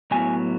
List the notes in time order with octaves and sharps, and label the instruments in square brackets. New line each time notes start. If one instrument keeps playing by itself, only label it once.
[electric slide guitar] A2 F#3 B3 E4 G#5